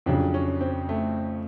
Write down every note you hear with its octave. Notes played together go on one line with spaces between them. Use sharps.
F2 C#3 F#3 D4
C#4
C4
A3